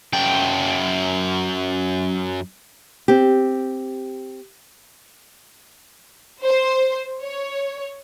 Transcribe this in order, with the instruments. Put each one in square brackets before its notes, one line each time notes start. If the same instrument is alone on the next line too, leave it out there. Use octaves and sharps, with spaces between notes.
[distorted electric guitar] F#2 G5
[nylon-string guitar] C4 G4
[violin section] C5
C#5